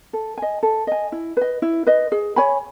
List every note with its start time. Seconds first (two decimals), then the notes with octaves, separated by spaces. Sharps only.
0.13 A4
0.37 D#5 G#5
0.63 A4
0.87 D#5 G#5
1.12 E4
1.37 B4 D#5
1.62 E4
1.86 B4 D#5
2.12 G#4
2.36 C#5 G#5 B5